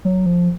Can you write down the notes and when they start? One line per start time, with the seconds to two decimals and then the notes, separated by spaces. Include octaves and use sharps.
0.05 F#3
0.26 F3